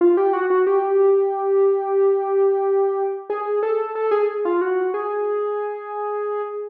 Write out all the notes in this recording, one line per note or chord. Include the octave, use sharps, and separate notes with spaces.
F4
G4
F#4
F#4
G4
G#4
A4
A4
G#4
F4
F#4
G#4